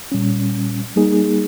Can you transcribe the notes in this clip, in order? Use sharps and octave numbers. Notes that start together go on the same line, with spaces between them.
A#2 G3 C#4
G3 A#3 D#4 G#4